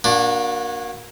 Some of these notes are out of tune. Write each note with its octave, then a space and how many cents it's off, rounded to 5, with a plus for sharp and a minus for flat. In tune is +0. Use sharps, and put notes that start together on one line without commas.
A#3 +15 D4 +0 F#4 -25